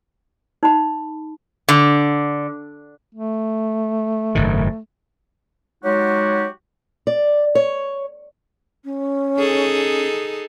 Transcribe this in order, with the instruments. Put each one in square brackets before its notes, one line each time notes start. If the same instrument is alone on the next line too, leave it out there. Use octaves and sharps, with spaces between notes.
[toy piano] D#4 B5
[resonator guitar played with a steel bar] D3
[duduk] A3
[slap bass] F#1 G#2 D#3
[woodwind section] F#3 G#3 D#4 F#4 G4 C#5
[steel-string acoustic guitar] D5
C#5
[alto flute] C#4
[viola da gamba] D#4 G#4 A4